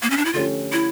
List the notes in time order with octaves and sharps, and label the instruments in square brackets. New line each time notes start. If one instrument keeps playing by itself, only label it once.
[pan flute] A#3
C#4
D4
E4
[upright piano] D3 F3 A3 C#4 G4 [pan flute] F4
[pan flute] E4